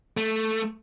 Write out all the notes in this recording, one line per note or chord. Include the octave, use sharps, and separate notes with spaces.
A3